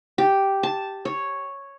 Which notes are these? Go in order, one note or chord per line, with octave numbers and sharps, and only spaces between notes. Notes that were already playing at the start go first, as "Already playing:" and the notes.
G4
A5
C#5